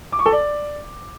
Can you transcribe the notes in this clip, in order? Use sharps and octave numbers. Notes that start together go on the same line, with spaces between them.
D6
C#6
A4
D5